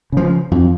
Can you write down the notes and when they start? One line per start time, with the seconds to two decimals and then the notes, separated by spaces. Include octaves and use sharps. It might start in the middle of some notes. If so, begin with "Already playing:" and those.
0.12 C#3 F3
0.51 F2